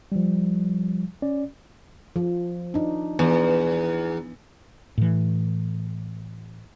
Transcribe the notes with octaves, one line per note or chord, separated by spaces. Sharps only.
F3 G3
C#4 D5
F3
D4 D#4
E2 B3
A2 E3